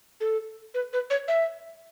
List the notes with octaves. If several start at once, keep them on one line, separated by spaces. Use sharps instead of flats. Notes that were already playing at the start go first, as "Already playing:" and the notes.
A4
B4
B4
C#5
E5